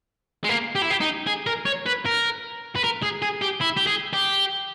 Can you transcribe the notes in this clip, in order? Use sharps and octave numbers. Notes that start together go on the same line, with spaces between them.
G#3
A#3
G4
E4
G4
D#4
G#4
A#4
C#5
B4
A#4
B4
A#4
G#4
G#4
G4
E4
G4
G#4
G4